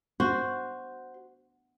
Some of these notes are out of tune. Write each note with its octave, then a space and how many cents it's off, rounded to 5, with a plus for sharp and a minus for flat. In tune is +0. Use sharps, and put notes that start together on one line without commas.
F#4 +0 C5 +0